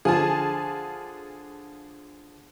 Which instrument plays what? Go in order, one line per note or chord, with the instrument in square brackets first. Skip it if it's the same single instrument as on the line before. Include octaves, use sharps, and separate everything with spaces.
[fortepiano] D3 F3 F4 [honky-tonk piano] G#4 G#5 A5